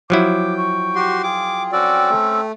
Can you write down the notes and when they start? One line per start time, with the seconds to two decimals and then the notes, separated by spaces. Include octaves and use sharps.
0.10 F3 F#3 E4 G5 D6
0.57 C#6
0.95 F#4 G4 C6
1.23 F4 G#4 G5 D6
1.72 C4 C#4 F#4 A4 D5
2.10 A3